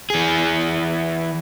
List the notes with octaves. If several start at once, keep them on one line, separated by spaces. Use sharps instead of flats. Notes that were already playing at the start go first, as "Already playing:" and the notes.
E3 G#4